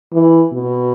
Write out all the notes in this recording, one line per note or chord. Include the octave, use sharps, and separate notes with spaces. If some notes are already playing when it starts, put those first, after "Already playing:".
E3
B2